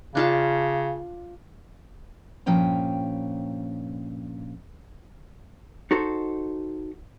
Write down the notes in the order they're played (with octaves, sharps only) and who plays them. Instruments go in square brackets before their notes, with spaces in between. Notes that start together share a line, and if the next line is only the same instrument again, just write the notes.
[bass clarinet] C#3 [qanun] D4 F4 A5
[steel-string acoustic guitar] G2 A#2 F3 C#4 G5 A#5
[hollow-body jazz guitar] D#4 F#4 A4 C5